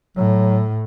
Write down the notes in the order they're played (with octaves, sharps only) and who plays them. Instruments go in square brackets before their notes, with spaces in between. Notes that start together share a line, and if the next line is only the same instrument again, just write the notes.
[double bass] A2 [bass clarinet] F#3